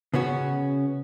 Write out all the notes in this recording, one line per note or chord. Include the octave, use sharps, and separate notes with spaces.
C#3 B3 C#4 F#4